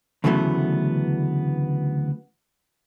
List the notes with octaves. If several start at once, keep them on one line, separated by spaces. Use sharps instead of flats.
D2 C#3 E3 F#3 A3 B3